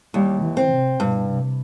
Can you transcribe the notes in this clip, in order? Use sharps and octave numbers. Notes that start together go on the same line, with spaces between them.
D#2 G3
E3
C4
C3
G2 B2
C3